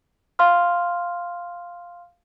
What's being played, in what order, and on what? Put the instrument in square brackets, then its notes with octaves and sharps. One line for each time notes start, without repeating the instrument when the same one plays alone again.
[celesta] F5 C6 F6